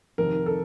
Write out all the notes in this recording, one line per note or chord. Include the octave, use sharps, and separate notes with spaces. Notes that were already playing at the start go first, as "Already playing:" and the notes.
F1 F2 D#3 A#4
A4